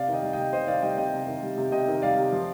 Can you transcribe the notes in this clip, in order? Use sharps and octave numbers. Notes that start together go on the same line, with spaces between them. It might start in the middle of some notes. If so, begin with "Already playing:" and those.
Already playing: C3 D5 F5
D#3
D#5 G5
G3
C3 D#5 G5
C3 C5 D#5
D#3 D5 F5
G3 D#5 G5
C3 D#5 G5
C3
D#3
G3
C3
C3 D#5 G5
D#3
G3 D5 F5
C3
F3